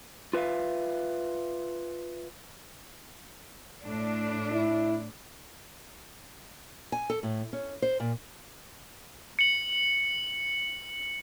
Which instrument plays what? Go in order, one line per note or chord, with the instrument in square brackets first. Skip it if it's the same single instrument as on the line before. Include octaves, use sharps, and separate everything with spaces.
[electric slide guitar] F4 B4 D5 E5 F5
[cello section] A2 D4
[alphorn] E4
[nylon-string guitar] G#5
A4
A2
C#4
C5
A#2
[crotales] C#7 F#7